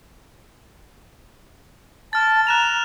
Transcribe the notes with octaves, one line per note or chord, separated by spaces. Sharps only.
A5 F6 A6
A#5 F#6 E7 F7